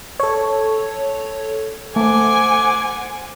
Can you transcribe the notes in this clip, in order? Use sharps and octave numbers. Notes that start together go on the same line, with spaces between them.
A4 C#5
A3 C5 F#5 G#5 D6